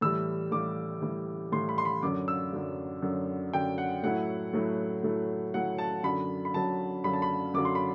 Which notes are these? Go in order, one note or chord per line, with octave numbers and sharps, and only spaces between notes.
A2 E3 G3 E6
A2 E3 G3 D6
A2 E3 G3
A2 E3 G3 C6
B5
C6
B5
F#2 D3 F#3 D6
E6
F#2 D3 F#3
F#2 D3 F#3
F#2 D3 F#3 G5
F#5
A2 F#3 A3 E4 F#5
A2 F#3 A3 E4
A2 F#3 A3 E4
A2 F#3 A3 E4 F#5
A5
F#2 D3 F#3 B5
B5
F#2 D3 F#3 A5
F#2 D3 F#3 B5
A5
B5
F#2 D3 F#3 D6
C6
B5